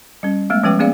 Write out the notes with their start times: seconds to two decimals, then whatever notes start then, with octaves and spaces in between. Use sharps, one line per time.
0.23 G3 C#4
0.50 G#3 A3 B3
0.63 F3 G#3 C#4 B4 G5 D6
0.79 A#3 B3 C#4 G#4 D5 F5